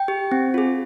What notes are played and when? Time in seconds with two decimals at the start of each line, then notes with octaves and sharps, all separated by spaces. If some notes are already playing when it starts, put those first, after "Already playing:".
Already playing: G5
0.08 G4
0.32 C4
0.54 F4 G#4